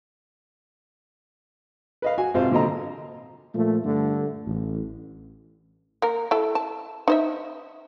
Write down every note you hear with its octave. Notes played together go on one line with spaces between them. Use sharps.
B4 D#5 F5
F#4 G#5
G#1 C3 F4 C5 F5
A#2 D3 F#3 D#5 A#5
A#2 F3 A3
G2 D3 A3
A1
A#3 A#4
E4 A4
A5
D#4 C5 E5